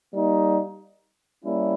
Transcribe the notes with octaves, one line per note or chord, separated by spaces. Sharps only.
G3 A#3 D#4
G3 A#3 C#4 E4